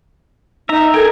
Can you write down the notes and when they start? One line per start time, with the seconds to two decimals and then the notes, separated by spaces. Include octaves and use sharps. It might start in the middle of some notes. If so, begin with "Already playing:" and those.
0.69 D#4 E5 A#5
0.94 A4 A#4 G5 G#5